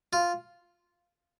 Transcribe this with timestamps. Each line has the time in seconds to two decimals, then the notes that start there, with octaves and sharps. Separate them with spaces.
0.13 F4